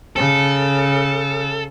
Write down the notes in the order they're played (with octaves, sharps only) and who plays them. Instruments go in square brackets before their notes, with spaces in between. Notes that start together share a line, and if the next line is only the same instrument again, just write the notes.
[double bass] C#3 [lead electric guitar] A4